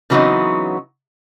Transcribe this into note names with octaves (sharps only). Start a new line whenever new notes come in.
C#3 E3 F#3 B3 C4 D#4